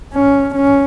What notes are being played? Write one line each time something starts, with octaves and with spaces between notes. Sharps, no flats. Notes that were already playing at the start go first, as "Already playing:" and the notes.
C#4
C#4